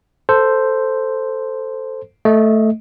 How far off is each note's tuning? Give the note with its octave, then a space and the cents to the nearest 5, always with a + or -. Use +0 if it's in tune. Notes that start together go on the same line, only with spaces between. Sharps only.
A4 +10 C5 +0
A3 +0 D#5 +15